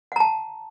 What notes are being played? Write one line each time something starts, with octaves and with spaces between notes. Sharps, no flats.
F#5 A5 A#5